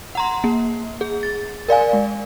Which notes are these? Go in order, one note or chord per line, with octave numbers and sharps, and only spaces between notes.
F#5 A#5 C6
A#3
G#4
A6
A#4 D5 F5 G#5
G#3